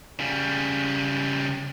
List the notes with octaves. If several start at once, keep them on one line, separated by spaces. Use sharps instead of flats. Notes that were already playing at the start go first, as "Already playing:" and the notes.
C#3 G3